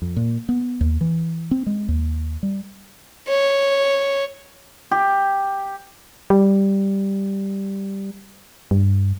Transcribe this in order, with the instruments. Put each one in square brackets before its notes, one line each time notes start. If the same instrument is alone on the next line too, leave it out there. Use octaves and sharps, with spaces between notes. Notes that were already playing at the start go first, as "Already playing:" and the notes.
[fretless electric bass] F2
A#2
B3
D#2
E3
C4
G#3
D#2
G3
[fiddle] C#5
[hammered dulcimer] G4
[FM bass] G3
G2